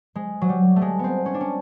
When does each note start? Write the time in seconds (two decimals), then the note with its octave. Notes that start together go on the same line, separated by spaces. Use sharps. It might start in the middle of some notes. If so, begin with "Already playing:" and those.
0.15 G#3
0.41 F#3
0.49 G3
0.76 A3
0.82 G#3
0.99 B3 C4
1.26 C#4
1.34 D4
1.41 C#4